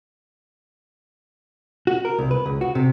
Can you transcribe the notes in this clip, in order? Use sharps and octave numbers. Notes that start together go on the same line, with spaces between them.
F#4
A#4
C2
B4
C#2
F#4
C3